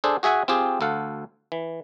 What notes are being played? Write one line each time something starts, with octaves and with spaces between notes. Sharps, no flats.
D4 G#4 A4 C5
F#4 G#4 E5 F#5 G#5
C4 F4 G4 G#4
D2 A4 F5 F#5
E3